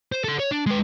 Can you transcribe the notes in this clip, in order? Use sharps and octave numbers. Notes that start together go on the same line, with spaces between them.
C5
A4 F#5
C#5
D4
G#3 B4